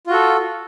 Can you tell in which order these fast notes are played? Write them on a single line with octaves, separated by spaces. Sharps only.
F4 F#4 A4